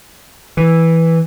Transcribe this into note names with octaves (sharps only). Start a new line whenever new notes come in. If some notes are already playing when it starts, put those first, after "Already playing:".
E3